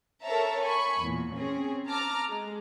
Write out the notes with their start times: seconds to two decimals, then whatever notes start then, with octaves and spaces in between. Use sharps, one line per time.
0.23 A4 A#4 C#5 E5 A5 A#5
0.61 G#5 B5 C#6
1.01 E2 A#2
1.34 C4 C#4 G#4
1.88 A5 A#5 D6 F6
2.29 G#3